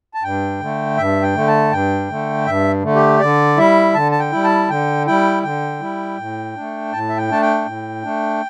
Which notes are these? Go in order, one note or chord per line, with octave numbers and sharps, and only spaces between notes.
A5
G2 G5
D3 A3
G2 E5
G5
D3 A3
A5
G2 G5
D3 A3
G2 E5
D3 A3
G4
D3 D5
G3 E4 E5
D3 A5
A5
G5
G3 E4
A5
D3 G5
G3 E4 G5
D3 G5
G3 E4
A2
A3 D4
A2 A5
E5
G5
A3 D4 A5
G5
A2
A3 D4